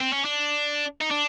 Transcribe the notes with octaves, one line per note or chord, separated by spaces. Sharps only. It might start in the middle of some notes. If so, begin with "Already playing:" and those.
C4
C#4
D4
D#4
D4